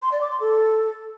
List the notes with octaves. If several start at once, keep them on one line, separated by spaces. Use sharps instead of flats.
C6
D5
D6
C6
A4